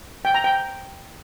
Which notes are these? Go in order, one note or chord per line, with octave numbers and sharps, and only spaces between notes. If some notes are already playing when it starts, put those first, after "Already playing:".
G5
A#5
G5